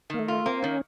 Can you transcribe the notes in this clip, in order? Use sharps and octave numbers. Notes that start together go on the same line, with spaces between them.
D#3 A#3
A3
F4
A#3 C4
D#3 C#4